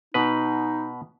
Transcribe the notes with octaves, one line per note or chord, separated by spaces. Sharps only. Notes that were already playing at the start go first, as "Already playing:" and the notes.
B2 D#4 B4